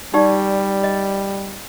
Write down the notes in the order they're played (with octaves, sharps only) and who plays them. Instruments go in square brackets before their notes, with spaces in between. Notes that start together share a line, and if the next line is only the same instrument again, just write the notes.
[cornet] G3 [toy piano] D#4 G4 D5
[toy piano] D#5